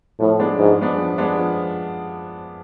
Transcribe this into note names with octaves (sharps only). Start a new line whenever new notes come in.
A2 F3
G#3 B3 D4
G#2 F3
G#3 B3 D4
F3
G#3 B3 D4
F3